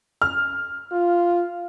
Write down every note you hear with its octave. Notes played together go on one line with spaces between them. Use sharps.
F6
F4